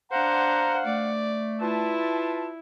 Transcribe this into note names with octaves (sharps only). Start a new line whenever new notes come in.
D4 C5 F5 F#5 A#5
A3 D5
E4 F4 B4 A5